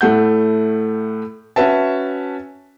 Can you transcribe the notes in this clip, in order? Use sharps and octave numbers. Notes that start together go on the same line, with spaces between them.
A2 A3 F#5 G6
C#4 F#4 B4 E5 A5